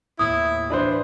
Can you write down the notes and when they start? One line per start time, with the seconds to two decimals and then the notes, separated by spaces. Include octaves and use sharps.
0.19 D#2 A2 B3 E4 D#6
0.70 E3 D4 B4 C5